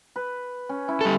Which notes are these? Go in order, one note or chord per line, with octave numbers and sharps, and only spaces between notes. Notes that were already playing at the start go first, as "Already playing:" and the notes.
B4
C#4
C#4 E4
G3 A4